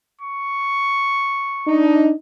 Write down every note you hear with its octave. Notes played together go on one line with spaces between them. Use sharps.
C#6
D4 D#4